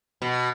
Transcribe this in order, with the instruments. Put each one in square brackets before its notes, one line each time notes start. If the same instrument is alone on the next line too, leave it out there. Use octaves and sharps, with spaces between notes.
[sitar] B2